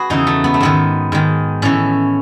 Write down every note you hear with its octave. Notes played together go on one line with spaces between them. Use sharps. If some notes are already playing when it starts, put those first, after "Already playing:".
Already playing: F#4 G#4 B4
E2 C#3 E3 D#4
A3
B3
A3
G#2 D#3 B3
G#2 D#3
A2 E3 C#4